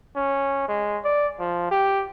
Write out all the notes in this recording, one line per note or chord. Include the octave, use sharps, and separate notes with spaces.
C#4
G#3
D5
F3
G4